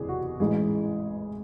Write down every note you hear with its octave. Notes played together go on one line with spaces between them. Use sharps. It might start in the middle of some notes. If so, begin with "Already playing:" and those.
Already playing: F#1 E2 C3 E3 G#4
F#4
A1 G#2 E3 G#3 G#4